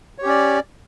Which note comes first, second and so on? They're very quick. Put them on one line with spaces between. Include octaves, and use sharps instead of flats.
C#5 G4 C#4 D5